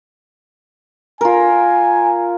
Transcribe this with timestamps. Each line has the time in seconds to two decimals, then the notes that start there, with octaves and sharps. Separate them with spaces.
1.21 F4 A#4 G#5